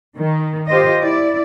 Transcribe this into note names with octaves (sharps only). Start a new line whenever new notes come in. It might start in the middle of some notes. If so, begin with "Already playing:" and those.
D#3
F4 G4 C5 D#5
E4 D5